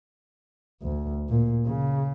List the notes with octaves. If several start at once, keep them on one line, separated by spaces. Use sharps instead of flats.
D2
A#2
C#3